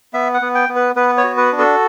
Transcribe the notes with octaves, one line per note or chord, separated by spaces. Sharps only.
B3 E5
F#5
B3
G5
B3
B4
B3 B4
C#5
F#4
B4
D4
A4